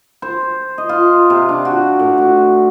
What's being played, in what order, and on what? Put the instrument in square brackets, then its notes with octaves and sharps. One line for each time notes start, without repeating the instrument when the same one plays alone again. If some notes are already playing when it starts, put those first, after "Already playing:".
[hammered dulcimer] C5
D#5
F4
C3
D4
F#4
A2
F#4